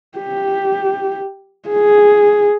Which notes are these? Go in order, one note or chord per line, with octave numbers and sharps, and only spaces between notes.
G4
G#4